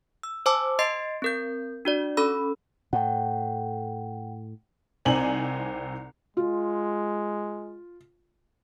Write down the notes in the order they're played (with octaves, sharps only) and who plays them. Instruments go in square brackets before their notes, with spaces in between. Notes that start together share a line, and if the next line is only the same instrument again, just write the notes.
[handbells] E6
C5 G#5 A5 D6 E6
D#5 C6 A6 C7 D7
C4 A#4 G6
D4 F#4 D5
C#4 A4 B5 E6
[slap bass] A2 [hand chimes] F#5 G5
[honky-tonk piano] C2 C4 D#4 D5 G#5 F#7
[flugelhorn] G#3 [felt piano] F4